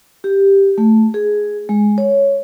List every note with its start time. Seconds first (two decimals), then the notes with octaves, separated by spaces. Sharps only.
0.24 G4
0.78 A3
1.14 G#4
1.69 G#3
1.98 C#5